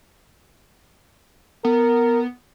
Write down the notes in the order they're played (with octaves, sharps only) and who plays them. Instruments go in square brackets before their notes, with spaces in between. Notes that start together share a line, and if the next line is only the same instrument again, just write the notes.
[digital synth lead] B3 [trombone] A#4